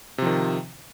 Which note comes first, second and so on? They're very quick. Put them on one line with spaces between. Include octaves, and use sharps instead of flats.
C3 F3 D#3